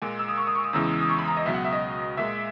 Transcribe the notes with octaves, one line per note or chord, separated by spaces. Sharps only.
A#2 G#3 G#5
E6
D#6
C#6
D#6
C#6
D#6
E2 C#3 E3 G#3 E6
D#6
E6
D#6
C#6
B5
A#5
D#5
C#2 B2 F#3 E5
F#5
E5
D#5
A#2 G#3 E5